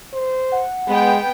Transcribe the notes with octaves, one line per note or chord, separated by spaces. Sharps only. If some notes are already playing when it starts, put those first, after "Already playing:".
C5
F#5
G#3 B3 G5